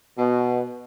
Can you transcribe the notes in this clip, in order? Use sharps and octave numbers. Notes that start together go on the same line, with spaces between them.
B2